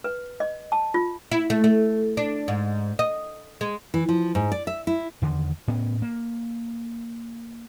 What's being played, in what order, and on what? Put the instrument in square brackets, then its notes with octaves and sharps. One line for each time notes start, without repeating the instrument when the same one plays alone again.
[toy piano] B4
D#5
A5
F4
[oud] E4
A3
A3
D4
G#2
D#5
G#3
[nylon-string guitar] E3
F3
G#2
D5
E5
E4
[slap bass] E2 D3 D#3
A2 B3 C#4
A#3